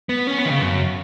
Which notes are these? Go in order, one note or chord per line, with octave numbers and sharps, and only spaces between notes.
B3
C#4
B3
D#3
C#3
F#2